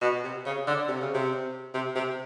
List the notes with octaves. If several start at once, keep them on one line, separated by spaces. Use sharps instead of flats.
B2
C3
C#3
D3
C3
C#3
C3
C3
C3